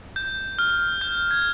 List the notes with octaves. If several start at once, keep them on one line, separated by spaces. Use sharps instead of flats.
G6
F6
G6
G#6